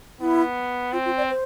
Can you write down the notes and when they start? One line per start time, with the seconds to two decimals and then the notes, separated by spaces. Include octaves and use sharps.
0.21 B3 E4
0.92 C4 F4
1.05 F4
1.17 D5
1.29 C5